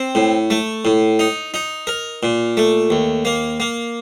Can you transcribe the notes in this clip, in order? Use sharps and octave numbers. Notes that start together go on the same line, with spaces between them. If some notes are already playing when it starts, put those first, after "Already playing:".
Already playing: C4
A2
A3
A2
D#4
D#4
A#4
A#2
A3
D#2
A#3
A#3